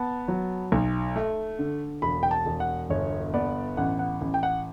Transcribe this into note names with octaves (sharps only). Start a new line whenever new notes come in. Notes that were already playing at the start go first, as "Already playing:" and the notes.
Already playing: B3 A5
F#3
B1
A3
D3
E1 B5
G5
A5
E1
F#5
G1 C#5
B3 D5
A1 F#5
F#5
A1
G5
F#5